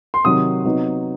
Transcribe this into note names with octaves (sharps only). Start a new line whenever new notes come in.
C6
C3 D#3 F#3 D#6
C3 F#3 B3 D#4